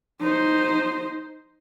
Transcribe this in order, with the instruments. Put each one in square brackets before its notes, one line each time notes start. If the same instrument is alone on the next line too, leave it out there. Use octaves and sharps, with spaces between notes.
[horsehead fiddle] D#4 C5